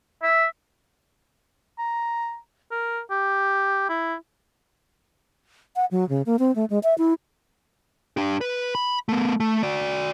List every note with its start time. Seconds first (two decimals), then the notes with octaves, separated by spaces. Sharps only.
0.23 E5
1.78 A#5
2.71 A#4
3.11 G4
3.89 E4
5.76 F#5
5.91 F#3
6.09 C#3
6.26 A#3
6.39 C4
6.55 A3
6.70 G#3
6.83 E5
6.98 E4
8.17 D4 G4
8.41 B4
8.75 B5
9.09 A3 B3
9.40 A3
9.63 F#4 D5